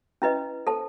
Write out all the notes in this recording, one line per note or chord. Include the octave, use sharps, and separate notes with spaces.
C#4 E4 B4 D#5
A4 C5 A5